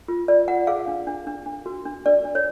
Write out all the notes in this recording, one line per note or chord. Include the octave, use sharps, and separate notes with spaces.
F4
F4 D5
F4 F#5
G#4 F5
D4
D4
D4
D4
F#4
D4
D4 D5
D4
C#5